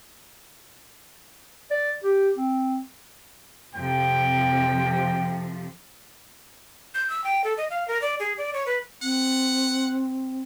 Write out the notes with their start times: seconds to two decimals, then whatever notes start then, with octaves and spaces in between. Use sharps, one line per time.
1.71 D5
2.04 G4
2.37 C4
3.75 F2 C3 F3 G5
6.94 G6
7.10 E6
7.24 G5
7.44 A4
7.57 D#5
7.70 F5
7.88 A#4
8.02 D5
8.20 G#4
8.38 D5
8.54 C#5
8.66 B4
9.02 C4 F#5